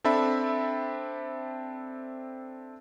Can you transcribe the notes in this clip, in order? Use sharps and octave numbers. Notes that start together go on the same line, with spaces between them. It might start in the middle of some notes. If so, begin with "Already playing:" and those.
C4 D4 A4 E5 B5